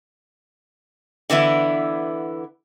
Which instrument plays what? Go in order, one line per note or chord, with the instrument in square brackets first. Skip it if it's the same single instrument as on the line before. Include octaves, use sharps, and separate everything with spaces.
[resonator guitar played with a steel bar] D3 E3 B3 E4